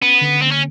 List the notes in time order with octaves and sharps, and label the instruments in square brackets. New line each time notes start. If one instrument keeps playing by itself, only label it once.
[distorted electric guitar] B3 [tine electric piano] C#4
[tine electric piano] D3
[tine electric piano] A#3 [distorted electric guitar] C4
[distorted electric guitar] C#4